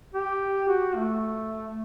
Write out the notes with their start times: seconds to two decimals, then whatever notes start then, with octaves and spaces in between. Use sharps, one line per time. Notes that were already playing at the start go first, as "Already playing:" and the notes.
0.14 G4
0.68 F#4
0.96 A3